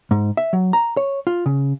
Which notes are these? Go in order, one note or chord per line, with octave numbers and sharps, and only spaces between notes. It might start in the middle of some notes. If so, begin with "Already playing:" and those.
G#2
E5
F#3
A#5
C#5
F4
C#3